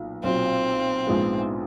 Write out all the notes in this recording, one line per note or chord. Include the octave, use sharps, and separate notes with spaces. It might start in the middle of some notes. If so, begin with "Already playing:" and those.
Already playing: B1 A#2
B1 A#2 F#3 C4
A#1 G#2 F3 G#3 B3